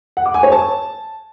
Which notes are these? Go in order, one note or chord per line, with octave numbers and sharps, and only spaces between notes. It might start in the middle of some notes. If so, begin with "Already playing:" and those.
F#5
D6
G#5
C#5
A5